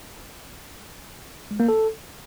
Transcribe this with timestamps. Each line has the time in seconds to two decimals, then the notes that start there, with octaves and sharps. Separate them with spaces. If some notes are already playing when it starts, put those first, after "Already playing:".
1.51 G#3
1.60 A#3
1.69 A4